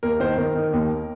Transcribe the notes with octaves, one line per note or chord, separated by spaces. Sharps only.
D#2 A#4
D#3 C5
D#3 A#4
D#3
D#2